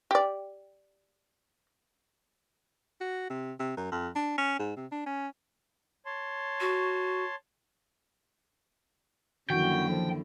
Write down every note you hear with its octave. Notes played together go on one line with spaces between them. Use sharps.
G4 D5
F#4
C3
C3
F#2
F2
D4
C#4
G#2
C3
D4
C#4
C#5 A5 C6
F#4
F#2 D3 D#3 F3 A#3 E4 F#4 G5
F3 A4